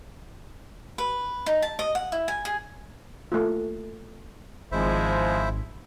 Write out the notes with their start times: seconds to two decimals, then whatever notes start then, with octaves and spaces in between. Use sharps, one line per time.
0.98 B4
1.46 D#4
1.62 A5
1.79 D#5
1.95 F#5
2.12 E4
2.28 G#5
2.45 G#4
3.32 A3 A#3 F4
4.72 G#1 F3 G#3 E4 C5 E5